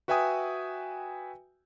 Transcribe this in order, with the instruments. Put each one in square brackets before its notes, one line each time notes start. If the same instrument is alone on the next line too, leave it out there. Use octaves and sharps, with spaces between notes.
[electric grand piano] F#4 B4 E5 G5 G#5 D#6